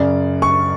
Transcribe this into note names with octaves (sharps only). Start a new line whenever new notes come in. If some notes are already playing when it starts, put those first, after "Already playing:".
Already playing: F#2 C#3 D5
C#6